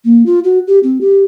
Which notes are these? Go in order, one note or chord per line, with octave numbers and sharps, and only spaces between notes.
A#3
F4
F#4
G4
C4
G4